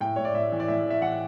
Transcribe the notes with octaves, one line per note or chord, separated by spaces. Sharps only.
A2 G5
A2 C#5
D5
A2 E5
E3
D5
A2 E5
E3 E5
E3 F#5